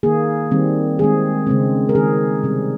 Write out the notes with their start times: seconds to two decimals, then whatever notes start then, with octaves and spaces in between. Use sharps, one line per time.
0.03 D#3 A#3 G#4
0.51 D#3 G3 C4
0.99 D#3 G#3 C4 G#4
1.47 C#3 G#3 C4
1.89 A#4
1.95 D#3 G#3 C4 G#4
2.43 C3 G3 C4